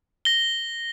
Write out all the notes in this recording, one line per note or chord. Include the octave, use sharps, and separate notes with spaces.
A#6 G7